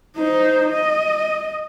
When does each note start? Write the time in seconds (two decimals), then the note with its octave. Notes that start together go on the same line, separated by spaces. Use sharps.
0.16 D#4 C5
0.71 D#5